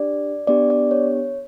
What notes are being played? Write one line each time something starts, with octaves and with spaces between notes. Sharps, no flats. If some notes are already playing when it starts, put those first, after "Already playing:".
Already playing: D4 G4 D5
B3 D4 G4 D5
D5
C#5